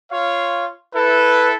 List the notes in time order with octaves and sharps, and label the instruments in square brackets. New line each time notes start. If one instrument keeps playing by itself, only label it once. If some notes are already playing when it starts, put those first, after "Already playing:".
[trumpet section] F4 C#5 F5
[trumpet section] E4 A4 [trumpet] B4